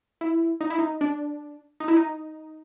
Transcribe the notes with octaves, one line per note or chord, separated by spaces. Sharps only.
E4
D#4
E4
D#4
D4
D#4
E4
D#4